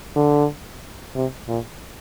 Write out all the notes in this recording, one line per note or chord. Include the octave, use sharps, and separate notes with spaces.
D3
C3
A#2